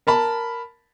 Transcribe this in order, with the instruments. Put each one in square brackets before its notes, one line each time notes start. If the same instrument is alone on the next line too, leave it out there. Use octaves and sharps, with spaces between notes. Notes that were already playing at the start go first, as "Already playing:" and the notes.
[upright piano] A#4 A5 B5